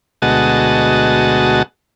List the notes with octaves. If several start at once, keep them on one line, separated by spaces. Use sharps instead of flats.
D2 B2 G#3 F#4 D#5 A5